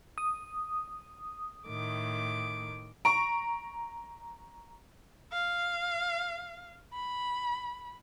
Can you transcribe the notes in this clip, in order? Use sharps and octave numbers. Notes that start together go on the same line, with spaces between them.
D#6
A2 D#3 D6
A#5 C#6 D7
F5
B5